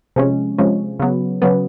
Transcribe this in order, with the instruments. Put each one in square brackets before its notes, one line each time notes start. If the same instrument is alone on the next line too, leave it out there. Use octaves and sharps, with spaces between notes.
[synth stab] C3 F3 G#3 C#4
C3 F3 G#3 C#4
C#3 F#3 B3
C#3 F#3 B3